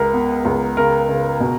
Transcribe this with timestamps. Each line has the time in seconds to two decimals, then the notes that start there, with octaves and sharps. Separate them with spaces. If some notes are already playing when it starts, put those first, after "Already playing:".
Already playing: C#2 A#4
0.14 B3
0.45 C#2
0.77 C#3 A#4
1.09 C#3
1.40 B2